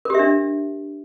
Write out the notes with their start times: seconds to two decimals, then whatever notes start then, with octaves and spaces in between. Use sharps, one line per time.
0.05 A#4
0.10 G4
0.15 E5
0.19 D4